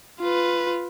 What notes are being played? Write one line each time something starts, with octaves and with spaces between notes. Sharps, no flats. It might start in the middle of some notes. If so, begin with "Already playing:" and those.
F4 B4